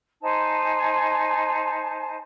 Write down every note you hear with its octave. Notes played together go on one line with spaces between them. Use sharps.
D#4 C5 G#5 A5